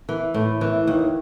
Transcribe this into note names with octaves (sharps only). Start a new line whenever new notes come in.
E3
A2
E3
D#2